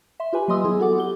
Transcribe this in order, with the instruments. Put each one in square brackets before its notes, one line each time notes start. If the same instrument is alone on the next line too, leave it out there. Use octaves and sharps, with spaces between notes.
[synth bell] E5 C6
F4 G4 B4 G#5 B5
F#3 A#3 D#5 C6 D#6 E6
F#3 B3 E4 G#4
B3 F#4 A4 F#5 D6
G4 G7